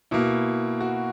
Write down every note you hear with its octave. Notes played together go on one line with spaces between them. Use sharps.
B2 A#3 E4
F#4